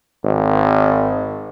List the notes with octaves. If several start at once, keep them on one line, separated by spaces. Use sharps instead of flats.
G#1